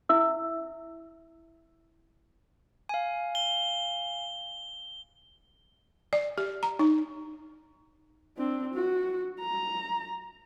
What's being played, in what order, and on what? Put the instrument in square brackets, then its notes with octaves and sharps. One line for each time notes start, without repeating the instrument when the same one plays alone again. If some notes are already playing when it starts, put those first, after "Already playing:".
[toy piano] E4 E5 E6
[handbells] F5 G#5
[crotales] G7
[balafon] D5
G4
A#5
D#4
[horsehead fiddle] C4 D4
F#4
A#5